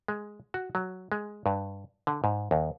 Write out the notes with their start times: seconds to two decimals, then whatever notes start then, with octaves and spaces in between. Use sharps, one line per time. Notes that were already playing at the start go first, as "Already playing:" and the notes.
0.08 G#3
0.54 F#4
0.75 F#3
1.12 G#3
1.46 G2
2.07 D3
2.24 G#2
2.51 D#2